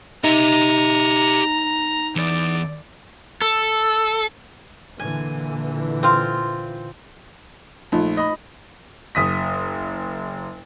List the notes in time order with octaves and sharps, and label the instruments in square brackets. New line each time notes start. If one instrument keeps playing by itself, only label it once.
[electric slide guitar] D#4 [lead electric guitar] G4 E5 [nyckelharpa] A#5
[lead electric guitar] E2 [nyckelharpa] D5
[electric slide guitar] A4
[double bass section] A#2 D3 E3 [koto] G#5
[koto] C4 F4
[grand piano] A#1 [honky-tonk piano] F3 A3 D#4
[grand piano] D#5 B5
F#1 D#6 B6